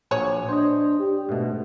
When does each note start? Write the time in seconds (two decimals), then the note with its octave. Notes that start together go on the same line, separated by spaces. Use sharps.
0.11 A#1 F#3 G#4 C#5
0.49 D4 C5 D#5
0.99 G4
1.29 G#2 B2 A3